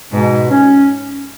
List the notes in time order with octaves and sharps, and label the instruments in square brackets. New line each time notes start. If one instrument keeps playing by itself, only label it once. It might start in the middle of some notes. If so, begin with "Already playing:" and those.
[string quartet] G#2 [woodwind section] B2
[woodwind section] C#4